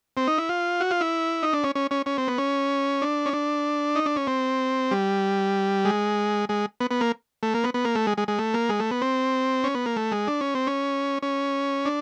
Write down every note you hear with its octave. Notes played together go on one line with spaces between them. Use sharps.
C4
D#4
E4
F4
F#4
F4
E4
D#4
D4
C#4
C#4
C#4
C#4
C4
B3
C#4
D4
C#4
D4
D#4
D4
C#4
C4
G3
G#3
G#3
B3
B3
A#3
A3
A#3
B3
B3
A#3
A3
G#3
G#3
G#3
A3
A#3
G#3
A3
B3
C4
C#4
B3
A#3
A3
G#3
D4
C#4
C4
C#4
C#4
D4